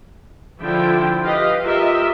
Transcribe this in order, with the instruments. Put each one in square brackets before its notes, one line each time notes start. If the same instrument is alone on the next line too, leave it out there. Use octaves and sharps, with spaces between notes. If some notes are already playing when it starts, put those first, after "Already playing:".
[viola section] D3 F3 E4 F4 G5
G4 B4 D#5 F5
F4 G4 A#4 D#5 E5